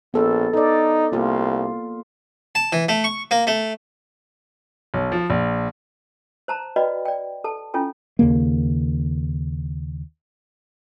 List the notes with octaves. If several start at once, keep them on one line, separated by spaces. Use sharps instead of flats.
A#1 B3 A4
D#4 A4 D5
C2 A#3 F4
A5
E3
A3
C#6
A#3
A3
B1
F3
A#1
C5 A5 A#5
F#4 B4 D5 D#5 G5 B5
D5 G5
A4 A5
C#4 E4 F4 A4 G5 G#5
D#2 C#3 A#3